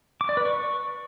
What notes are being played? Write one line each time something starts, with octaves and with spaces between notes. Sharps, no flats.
D6
D5
B4
C#6